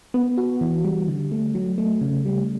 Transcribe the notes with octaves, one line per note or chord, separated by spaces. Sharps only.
B3
F#4
E3
G3
D3
A3
F#3
A3
C#3
G3